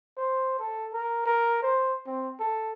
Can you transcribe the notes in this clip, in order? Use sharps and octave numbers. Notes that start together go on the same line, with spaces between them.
C5
A4
A#4
A#4
C5
C4
A4